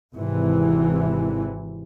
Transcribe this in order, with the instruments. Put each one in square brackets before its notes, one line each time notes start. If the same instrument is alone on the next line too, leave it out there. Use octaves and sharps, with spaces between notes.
[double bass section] G#1 C3 E3